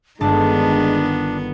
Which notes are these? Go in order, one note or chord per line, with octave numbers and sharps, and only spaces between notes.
G1 D#3 G#3 B3 D4 A5